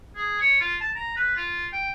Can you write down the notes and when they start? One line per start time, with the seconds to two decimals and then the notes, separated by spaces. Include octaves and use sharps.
0.16 G#4
0.41 C#5
0.61 F4
0.81 A5
0.95 A#5
1.16 B4
1.37 F4
1.73 G5